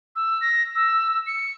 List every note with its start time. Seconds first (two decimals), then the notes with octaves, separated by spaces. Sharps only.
0.16 E6
0.41 A#6
0.75 E6
1.26 C#7